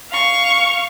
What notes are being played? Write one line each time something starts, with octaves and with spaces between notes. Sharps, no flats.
F5 C#6